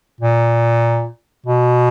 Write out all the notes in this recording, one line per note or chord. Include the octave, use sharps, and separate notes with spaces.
A#2
B2